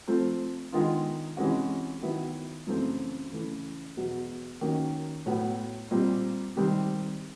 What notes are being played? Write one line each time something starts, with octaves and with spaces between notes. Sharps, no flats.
F3 A3 C4
D#3 G#3 B3 D4 F4
C3 E3 G#3 C#4 F#4
D#3 F#3 B3 E4
F#2 C#3 E3 A3 C4
C#3 E3 A3
E2 B2 F#3
D#3 F#3 A#3 C#4
A2 F#3 B3
A#2 G3 C4
C3 D#3 G3 C4